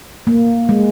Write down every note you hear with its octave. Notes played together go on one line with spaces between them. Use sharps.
A#3
G#3